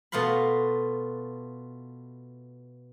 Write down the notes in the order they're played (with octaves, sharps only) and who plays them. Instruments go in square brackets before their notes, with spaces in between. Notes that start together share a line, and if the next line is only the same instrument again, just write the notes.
[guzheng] B2 A3 F4 F5 B5